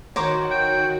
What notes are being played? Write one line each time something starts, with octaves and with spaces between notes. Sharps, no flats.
D#3 F#4 A#4 C5 C#5 D6
G5